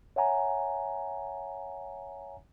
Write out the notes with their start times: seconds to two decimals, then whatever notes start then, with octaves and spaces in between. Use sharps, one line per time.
0.16 C#5 E5 F#5 G#5 A#5